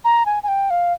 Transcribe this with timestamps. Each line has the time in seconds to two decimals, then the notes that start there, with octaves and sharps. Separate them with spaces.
0.05 A#5
0.26 G#5
0.43 G#5
0.48 G5
0.70 F5